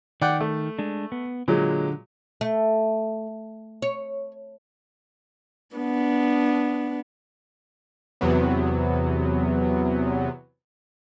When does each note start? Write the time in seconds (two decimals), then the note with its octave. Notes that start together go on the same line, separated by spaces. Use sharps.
0.22 D#3 D5 F#5 G5
0.40 A3
0.79 G#3 D4
1.12 B3
1.48 A#2 D3 F#3 G#3
2.41 A3
3.82 C#5
5.76 B3 D4
8.21 E2 C3 F#3 B3